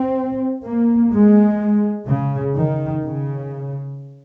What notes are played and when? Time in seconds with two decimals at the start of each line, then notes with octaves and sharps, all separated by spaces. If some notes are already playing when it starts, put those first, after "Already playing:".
Already playing: C4
0.65 A#3
1.12 G#3
2.08 C#3
2.57 D#3
3.05 C#3